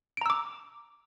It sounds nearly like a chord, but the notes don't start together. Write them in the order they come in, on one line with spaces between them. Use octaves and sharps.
D7 A#5 E6 D6